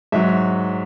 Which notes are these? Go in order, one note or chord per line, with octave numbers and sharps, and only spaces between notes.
G#2 F#3 E5